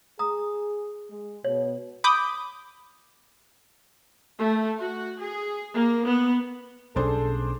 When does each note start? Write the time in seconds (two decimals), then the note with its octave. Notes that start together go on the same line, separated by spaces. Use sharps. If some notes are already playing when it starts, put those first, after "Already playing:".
0.19 G#4 A#5 D#6
1.10 G#3
1.45 B2 C#5
2.04 B5 D6 D#6 G6
4.37 A3
4.78 F#4
5.18 G#4
5.74 A#3
6.06 B3
6.96 B1 G3 C#4 D4 G#4 A4 C5